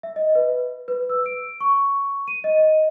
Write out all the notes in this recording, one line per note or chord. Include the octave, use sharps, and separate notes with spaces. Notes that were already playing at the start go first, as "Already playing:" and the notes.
E5
D#5
B4
B4
E6
D7
C#6
D#7
D#5